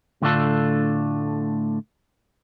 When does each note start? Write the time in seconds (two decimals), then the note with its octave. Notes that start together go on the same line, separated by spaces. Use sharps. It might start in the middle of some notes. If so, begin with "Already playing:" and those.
0.22 A2 D3 A3 D4 F4 A4